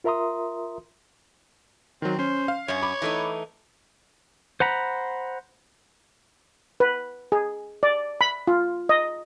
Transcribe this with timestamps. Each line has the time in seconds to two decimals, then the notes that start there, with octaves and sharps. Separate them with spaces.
0.04 F4 A#4 E5 A#5 C6 D#6
2.02 D#3 F#3 C4
2.19 C#4 C5
2.48 F5
2.68 F#2 C#4 C#5
2.83 B5 D6
3.02 E3 A3 D#4
4.60 C5 F#5 A#5 B5
6.80 B4
7.32 G#4
7.83 D5
8.21 B5
8.47 F4
8.89 D#5